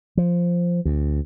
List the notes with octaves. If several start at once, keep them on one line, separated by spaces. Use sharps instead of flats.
F3
D2